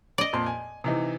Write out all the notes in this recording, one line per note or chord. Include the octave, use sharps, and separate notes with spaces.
D5 D#5
F2 A#2 C6
G#5
C3 E3 D#4